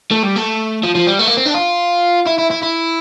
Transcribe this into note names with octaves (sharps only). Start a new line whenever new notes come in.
A3
G3
A3
F3
F3
G3
A3
A#3
C4
D4
F4
E4
E4
E4
E4